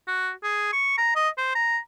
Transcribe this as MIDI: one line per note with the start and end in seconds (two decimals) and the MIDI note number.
0.07 0.31 66
0.43 0.69 68
0.73 0.96 85
0.98 1.15 82
1.16 1.29 75
1.38 1.51 72
1.55 1.78 82